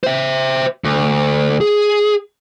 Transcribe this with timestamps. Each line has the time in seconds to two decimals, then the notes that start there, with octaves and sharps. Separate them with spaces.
0.04 C5 E5
0.84 D2
1.61 G#4